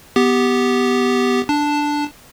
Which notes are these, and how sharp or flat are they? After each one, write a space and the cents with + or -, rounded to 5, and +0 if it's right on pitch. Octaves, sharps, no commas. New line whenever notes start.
B3 +0 G4 +0
D4 +0 A5 +0